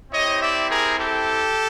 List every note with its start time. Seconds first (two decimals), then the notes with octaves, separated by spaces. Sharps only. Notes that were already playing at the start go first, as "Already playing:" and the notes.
0.11 C4 E4 G4 C#5 D#5
0.40 D5 E5
0.70 G#4 A#4
0.98 G4 A4